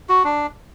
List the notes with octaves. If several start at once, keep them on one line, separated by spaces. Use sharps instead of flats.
F#4
D4